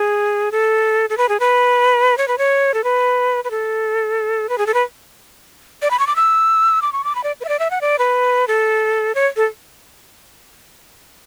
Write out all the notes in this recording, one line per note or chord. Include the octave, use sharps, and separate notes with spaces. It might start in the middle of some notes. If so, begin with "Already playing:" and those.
Already playing: G#4
A4
A4
B4
G#4
B4
C#5
B4
C#5
A4
B4
B4
A4
B4
G#4
A4
B4
D5
B5
C#6
D6
E6
D6
C#6
D6
B5
D5
B4
E5
D5
E5
F#5
D5
B4
A4
C#5
A4